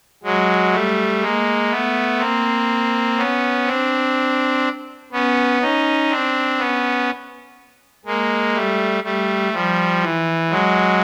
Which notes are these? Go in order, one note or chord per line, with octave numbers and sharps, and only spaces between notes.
F#3 G#3
G3 A3
G#3 A#3
A3 B3
A#3 C4
B3 C#4
C4 D4
B3 C#4
C#4 D#4
C4 D4
B3 C#4
G#3 A#3
G3 A3
G3 A3
F3 G3
E3
F#3 G#3